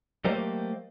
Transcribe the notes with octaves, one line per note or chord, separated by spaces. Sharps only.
F#3 A3 A#3 G4 C5 D#5